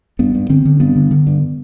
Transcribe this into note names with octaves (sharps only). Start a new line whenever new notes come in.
G2 B3
G2
D3 C4
D3
G2 B3
D3
D3
G2